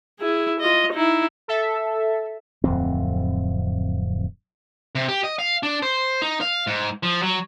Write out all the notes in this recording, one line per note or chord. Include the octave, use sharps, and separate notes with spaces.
E4 G#4
F4 D#5
D#4 E4
A4 E5
D1 F2 C4
C3
G4
D#5
F5
D4
C5
D#4
F5
G#2
F3
F#3